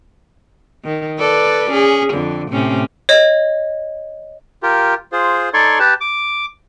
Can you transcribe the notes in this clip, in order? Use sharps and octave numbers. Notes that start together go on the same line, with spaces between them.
D#3
A4 B4 D5
C#4 G#4
F2 D3
A2 C3 C#4
C#5 D#5
F4 G4 A#4
F4 G#4 C5
D#4 A4 C#5 D5 C6 C#6
G4 B4 A5
D6